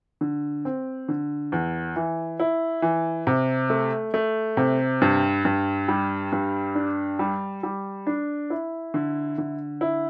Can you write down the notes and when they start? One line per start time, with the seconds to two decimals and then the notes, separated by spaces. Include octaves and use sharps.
0.21 D3
0.65 C4
1.09 D3
1.52 E2
1.96 E3
2.40 E4
2.82 E3
3.27 C3
3.70 A3
4.14 A3
4.57 C3
5.02 G2
5.45 G2
5.88 G3
6.32 G2
6.75 D4
7.19 G3
7.63 G3
8.07 D4
8.50 E4
8.94 D3
9.38 D3
9.81 E4